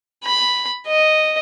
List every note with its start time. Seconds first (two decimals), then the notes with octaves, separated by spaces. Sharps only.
0.25 B5
0.87 D#5